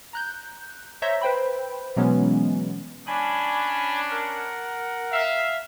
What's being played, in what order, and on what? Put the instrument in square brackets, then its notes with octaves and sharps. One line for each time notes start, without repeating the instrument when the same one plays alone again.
[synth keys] A#5 F#6 G6
C5 C#5 E5 A#5 G6 A#6
B4 C5 G5 B5
B2 E3 F#3 G#3 B3 C#4
[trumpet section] C#4 D4 [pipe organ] G#5 B5
[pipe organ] A#4 F#5
[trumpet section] E5 F5